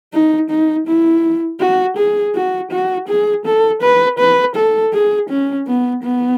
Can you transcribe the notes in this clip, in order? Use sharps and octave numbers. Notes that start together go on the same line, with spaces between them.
D#4
D#4
E4
F#4
G#4
F#4
F#4
G#4
A4
B4
B4
A4
G#4
C#4
B3
B3